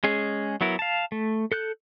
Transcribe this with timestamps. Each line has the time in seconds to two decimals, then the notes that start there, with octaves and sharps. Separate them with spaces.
0.04 G#3 C#4 G#4
0.61 F#3 B3 E4 A#4
0.79 F5 A5
1.12 A3
1.52 A4 F#6 G6